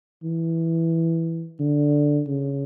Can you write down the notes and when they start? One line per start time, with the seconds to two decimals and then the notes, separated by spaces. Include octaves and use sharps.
0.23 E3
1.60 D3
2.28 C#3